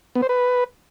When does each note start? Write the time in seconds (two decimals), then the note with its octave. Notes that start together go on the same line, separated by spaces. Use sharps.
0.15 B3
0.22 C5
0.29 B4